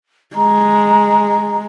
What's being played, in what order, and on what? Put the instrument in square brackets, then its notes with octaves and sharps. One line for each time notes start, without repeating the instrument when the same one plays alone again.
[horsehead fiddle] G#3 [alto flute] A#5